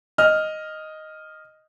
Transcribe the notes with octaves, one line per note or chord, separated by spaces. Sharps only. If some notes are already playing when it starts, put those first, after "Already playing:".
D#5 F6